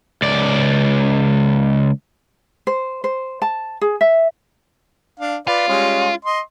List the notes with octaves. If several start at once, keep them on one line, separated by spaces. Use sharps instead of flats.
C#2 D5
C5
C5
A5
G#4
E5
D4 F5
F4 B4 D5
G3 G#3 C#4
D#5 C6